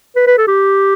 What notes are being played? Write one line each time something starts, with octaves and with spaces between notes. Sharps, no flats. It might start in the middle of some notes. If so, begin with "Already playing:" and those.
B4
B4
A4
G4